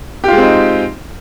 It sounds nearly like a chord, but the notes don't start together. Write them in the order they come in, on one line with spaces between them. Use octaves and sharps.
G4 F4 G#3 C4 D#4